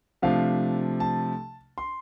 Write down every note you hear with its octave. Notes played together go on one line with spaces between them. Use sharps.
C3 F3 A3 D4 F5
A5
C6